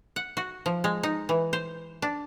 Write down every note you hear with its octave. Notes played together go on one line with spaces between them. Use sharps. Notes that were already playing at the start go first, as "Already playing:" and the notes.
F#5
F#4
F3
G#3
D#4
E3
C5
D4